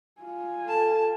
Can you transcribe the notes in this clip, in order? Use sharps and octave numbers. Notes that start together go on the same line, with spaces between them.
F4 G#5
A4 A5